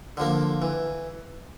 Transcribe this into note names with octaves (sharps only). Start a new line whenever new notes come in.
D3 F3 A#3
E3